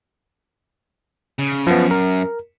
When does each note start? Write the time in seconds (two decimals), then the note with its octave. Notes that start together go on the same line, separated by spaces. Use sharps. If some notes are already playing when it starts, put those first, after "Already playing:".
1.39 C#3
1.67 F#2 F3 B3
1.91 A#4